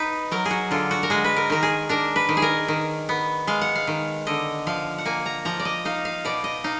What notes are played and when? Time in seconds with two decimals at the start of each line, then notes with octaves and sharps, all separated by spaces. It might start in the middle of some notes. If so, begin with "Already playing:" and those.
Already playing: D#4 B4
0.32 F#3 A#4
0.45 G#4
0.50 F#4
0.71 D3 F4
0.91 F#4
1.03 A#4
1.10 G#3 G#4
1.24 B4
1.37 A#4
1.50 D#3 A#4
1.63 G#4
1.89 D4 A#4
2.16 B4
2.29 D#3
2.37 G#4
2.42 A#4
2.68 D#3
3.09 B3
3.47 G#3 F5
3.61 F#5
3.76 F5
3.87 D#3
4.27 D3 D#5
4.67 F3 F5
4.98 F#5
5.06 A#3 G#5
5.26 A#5
5.45 F3 A#5
5.60 D5
5.65 D#5
5.85 D#4 F5
6.05 F5
6.25 B2 D5
6.44 D#5
6.64 D#4 F5